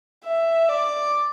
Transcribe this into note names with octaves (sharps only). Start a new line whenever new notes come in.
E5
D5